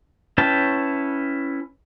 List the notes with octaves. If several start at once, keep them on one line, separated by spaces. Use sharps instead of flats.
C#4 E4 B4 G5 A5